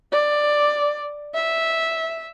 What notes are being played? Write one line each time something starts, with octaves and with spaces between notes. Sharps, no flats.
D5
E5